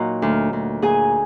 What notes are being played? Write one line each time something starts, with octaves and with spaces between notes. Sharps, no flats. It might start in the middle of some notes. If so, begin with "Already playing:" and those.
Already playing: A#2 F#3 D#4 F#4 D#5 F#5
D2
D2
A#2 G#4 G#5